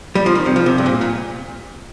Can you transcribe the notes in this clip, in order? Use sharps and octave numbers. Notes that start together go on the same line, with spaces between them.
G3
F3
D#3
C3
F3
C3
G2
A#2
A#2